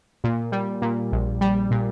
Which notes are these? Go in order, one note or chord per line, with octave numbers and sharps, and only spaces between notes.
A#2
G3
A#2
A#1
G3
A#2